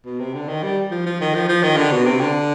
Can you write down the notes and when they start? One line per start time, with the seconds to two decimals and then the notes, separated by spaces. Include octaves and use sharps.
0.05 B2
0.20 C3
0.33 D3
0.48 D#3
0.63 G3
0.91 F3
1.06 F3
1.20 D#3
1.34 F3
1.49 F3
1.63 D#3
1.77 D3
1.91 B2
2.06 C3
2.20 D3